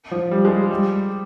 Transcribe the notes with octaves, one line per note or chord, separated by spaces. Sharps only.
F3
G3
G#3
G3